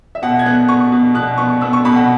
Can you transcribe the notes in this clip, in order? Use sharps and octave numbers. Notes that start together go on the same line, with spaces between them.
E5
B2 F#5
G#6
B3 F#6
B3 C#6
B2
B2 F#6
B3 C#6
B3 E6
C#6
B2 B5
F#5